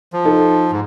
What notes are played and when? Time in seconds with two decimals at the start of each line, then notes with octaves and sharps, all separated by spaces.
0.13 F3
0.25 D#4 A4
0.71 G#2